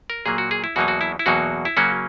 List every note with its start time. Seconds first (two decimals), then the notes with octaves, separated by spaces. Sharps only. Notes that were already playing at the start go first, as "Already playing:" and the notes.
0.10 A#4
0.26 A#2 F#3 A#3 G#4
0.38 F#4
0.51 G#4
0.64 E4
0.76 E2 B2 F#3 A#3 D#4 F#4
0.88 F#4
1.01 E4
1.19 E4
1.26 E2 B2 F#3 A#3 D#4 F#4
1.65 E4
1.77 C#3 F#3 A#3 C#4 F#4